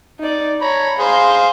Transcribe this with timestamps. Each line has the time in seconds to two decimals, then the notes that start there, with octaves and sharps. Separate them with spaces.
0.19 D#4 D5
0.61 C#5 A#5 B5
0.99 G#4 C5 F5 C6